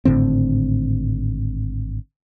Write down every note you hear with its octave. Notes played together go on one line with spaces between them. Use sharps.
G#1 A2 D3 C4